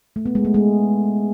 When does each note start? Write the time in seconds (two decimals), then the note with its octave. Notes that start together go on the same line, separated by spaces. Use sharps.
0.16 A3
0.26 B3
0.35 G#3
0.45 A3
0.54 G#3